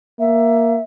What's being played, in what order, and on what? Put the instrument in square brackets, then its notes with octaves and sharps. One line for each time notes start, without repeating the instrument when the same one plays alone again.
[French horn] A#3 [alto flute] E5